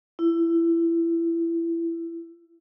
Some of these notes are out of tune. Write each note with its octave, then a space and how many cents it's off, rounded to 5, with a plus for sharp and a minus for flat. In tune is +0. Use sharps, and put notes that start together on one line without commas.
E4 +20